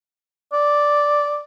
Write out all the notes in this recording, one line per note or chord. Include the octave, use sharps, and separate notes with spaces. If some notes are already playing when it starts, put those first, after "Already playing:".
D5